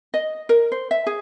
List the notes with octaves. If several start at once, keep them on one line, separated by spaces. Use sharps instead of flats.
D#5
A#4
C5
E5
G#4